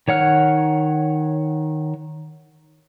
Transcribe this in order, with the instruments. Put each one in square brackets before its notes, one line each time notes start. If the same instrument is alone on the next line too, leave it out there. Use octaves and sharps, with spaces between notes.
[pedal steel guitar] D#3 C#5 F#5 F6